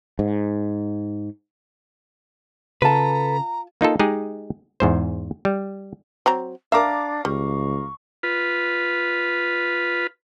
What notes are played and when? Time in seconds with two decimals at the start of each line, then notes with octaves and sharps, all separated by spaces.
0.19 G#2
2.82 C#3 F4 A4 B4 A5 A#5
3.81 A#3 D#4 F4 A4
3.99 G#3 D#4 G4 G#4
4.80 E2 G#2 C5
5.45 G3
6.26 F#3 C4 A#5
6.72 D4 A#4 E5 F5 A#5 D6
7.25 C#2 G3 C#6
8.23 F4 B4